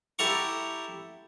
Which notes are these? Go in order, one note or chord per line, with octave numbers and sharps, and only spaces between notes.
E4 G4 A4 F#5 A#5 C#6